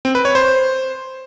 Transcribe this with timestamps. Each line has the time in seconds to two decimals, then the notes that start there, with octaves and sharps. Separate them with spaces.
0.05 C4
0.15 B4
0.25 C#5
0.35 C5